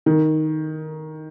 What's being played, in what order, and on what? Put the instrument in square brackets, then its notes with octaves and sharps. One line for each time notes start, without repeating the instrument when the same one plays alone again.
[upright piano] D#3